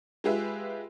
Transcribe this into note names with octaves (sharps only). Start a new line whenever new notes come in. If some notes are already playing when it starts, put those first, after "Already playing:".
G#3 F4 G4 G#4 B4 E5